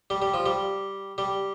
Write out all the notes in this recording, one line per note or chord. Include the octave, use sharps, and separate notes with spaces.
G3
G3
F3
G3
G3